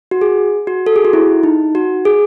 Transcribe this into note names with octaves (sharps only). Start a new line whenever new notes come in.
F#4
G#4
F#4
A4
G#4
F#4
E4
D#4
F#4
G#4